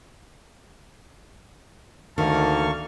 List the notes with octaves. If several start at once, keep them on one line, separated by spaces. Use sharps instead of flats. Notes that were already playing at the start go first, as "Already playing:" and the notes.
D2 D#3 A#3 A5 C#6 F6